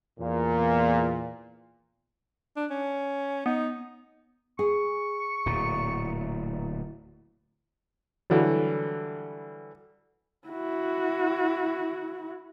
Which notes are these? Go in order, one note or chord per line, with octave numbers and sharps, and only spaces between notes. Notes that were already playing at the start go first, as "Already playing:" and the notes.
E2 A#2
D4
C#4
B3 D#4
G#4 C#6
D1 A#2
D3 E3 F#3 G3
E4 F#4